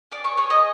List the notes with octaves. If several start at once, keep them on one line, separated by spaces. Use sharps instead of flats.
G#4 D5 D6
C#5 C#6
G#4 C#5 C#6
D#5 D#6